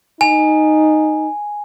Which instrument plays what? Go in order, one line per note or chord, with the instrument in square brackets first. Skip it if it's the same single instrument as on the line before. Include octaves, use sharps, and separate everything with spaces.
[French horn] D#4 [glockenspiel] G#5